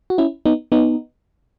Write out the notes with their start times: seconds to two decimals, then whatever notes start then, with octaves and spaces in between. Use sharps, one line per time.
0.10 F#4
0.18 C#4 E4
0.45 B3 D#4
0.72 B3 D#4